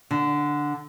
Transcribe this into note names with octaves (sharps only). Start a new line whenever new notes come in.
D3